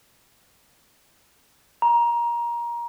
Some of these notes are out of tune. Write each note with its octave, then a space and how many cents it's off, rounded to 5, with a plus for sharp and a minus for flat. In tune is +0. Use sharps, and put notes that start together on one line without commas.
A#5 +20